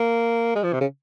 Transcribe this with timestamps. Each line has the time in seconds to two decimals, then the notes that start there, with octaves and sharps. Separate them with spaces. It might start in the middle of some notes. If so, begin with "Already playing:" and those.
Already playing: A#3
0.55 G#3
0.63 F3
0.73 C3
0.81 C#3